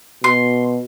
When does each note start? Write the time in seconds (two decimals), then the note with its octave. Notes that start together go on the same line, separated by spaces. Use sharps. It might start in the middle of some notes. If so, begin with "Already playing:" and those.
0.24 B2 C6